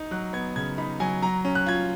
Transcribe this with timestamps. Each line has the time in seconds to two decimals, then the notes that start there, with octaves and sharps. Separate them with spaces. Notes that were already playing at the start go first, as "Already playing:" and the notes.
Already playing: D#4
0.11 F#3 F#6
0.33 B3 G#6
0.56 C#3 G#6
0.78 D#4 B5
1.00 F#3 G#5
1.22 F#3 A#5
1.45 C#4
1.55 F#6
1.66 F4 G#6